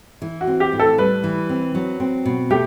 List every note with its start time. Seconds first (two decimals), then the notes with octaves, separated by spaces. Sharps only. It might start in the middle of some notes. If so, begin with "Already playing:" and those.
0.22 E3
0.41 F#4
0.47 C4
0.60 G4
0.73 A2
0.80 A4
0.98 G3 B4
1.24 E3
1.49 C4
1.75 F#3
2.00 C4
2.26 B2
2.50 A3 G4